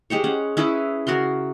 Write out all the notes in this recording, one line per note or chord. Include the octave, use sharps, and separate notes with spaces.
G#3 G4 C5 C#5
C#4 F#5
C#4 E4 G#4 B4
C#3 F#4 A#4 C6